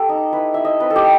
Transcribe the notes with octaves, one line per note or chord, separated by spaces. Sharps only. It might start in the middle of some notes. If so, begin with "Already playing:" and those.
Already playing: B3 G4 A4
D#4
E4 B4
E4 E5
D#5
C4 B4
A4
G4